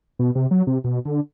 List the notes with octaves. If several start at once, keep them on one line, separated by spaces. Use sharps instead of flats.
B2
C3
F#3
C3
B2
D3